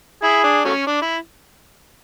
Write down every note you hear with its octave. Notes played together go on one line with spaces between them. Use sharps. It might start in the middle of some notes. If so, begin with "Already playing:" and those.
E4 G#4
D4
F#3 A3 C#4
D4
E4